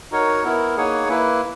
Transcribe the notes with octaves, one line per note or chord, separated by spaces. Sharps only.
D#4 F#4 A#4 C#5 F#5
B3 E4 A#4
A#3 D#4 G#4 C#5 F#5
A#3 E4 B4